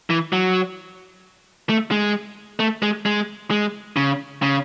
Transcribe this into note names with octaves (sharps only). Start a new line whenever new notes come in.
E3
F#3
A3
G#3
A3
G#3
G#3
G#3
C#3
C#3